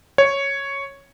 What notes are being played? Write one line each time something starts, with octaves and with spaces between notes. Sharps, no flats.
C#5